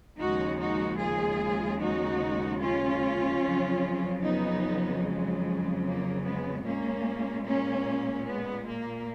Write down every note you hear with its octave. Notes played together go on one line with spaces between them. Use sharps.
D#2 C#3 F3 G#3 D#4 F#4
D#4 F#4
F4 G#4
D#4 F#4
C#4 F4
F2 C#3 F#3
B3 D#4
G#3
A#3
G#3 B3
A#2 G#3 A#3 C#4
A#3 C#4
G#3 B3
A#3